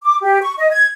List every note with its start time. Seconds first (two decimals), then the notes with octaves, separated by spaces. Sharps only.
0.04 D6
0.22 G4
0.42 C#6
0.58 D#5
0.72 G#6